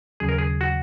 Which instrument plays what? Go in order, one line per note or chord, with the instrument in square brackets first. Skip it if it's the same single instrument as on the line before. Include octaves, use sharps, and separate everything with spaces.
[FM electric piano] D#2 C#3 F#3 [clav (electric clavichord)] G#4
[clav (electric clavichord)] A#4
G#4
F#4